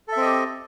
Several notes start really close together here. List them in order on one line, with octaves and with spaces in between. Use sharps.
A4 E5 C4 D#5 G4